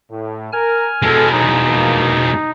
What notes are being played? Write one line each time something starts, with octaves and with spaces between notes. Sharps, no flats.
A2
A#4 G#5 F6
B2 G#3 A4
E2 F#3 D#4
F3 A#3